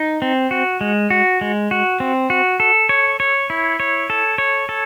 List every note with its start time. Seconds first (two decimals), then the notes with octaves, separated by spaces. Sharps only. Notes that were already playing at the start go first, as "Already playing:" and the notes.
Already playing: D#4
0.22 C4
0.51 F#4
0.81 G#3
1.10 F#4
1.41 G#3
1.71 F#4
2.00 C4
2.30 F#4
2.60 A4
2.89 C#5
3.20 C#5
3.50 E4
3.80 C#5
4.10 A4
4.38 C#5
4.69 A4